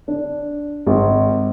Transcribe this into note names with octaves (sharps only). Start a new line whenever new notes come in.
D4
G#1